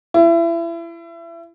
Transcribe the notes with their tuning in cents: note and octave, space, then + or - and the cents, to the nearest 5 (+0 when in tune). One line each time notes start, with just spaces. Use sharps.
E4 +30